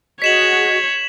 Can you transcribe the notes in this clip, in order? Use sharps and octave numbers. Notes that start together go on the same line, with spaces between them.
F#4 G#4 C#5 D#5 B6 E7 F#7